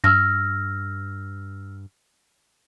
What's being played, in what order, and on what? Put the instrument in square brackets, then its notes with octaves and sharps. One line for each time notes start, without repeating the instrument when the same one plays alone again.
[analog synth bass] G2 [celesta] E6 F6 A#6